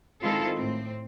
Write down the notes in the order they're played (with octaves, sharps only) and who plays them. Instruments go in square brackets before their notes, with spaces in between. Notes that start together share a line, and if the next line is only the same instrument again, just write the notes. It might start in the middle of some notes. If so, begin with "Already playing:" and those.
[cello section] D#3 G#3 C4 E4 F4 A4
A2 C4